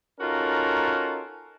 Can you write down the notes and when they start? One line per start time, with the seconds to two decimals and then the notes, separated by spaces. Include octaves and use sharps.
0.20 C#4 D#4 F4 F#4 A4 A#4